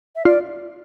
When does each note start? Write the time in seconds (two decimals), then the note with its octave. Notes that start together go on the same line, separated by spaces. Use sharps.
0.16 E5
0.25 F4 D5